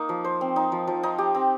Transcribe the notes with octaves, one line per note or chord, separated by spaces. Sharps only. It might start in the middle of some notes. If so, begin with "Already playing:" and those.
Already playing: A#3 D#4
F3
C5
C4
D#4
F3
F3
D#4
G4
C4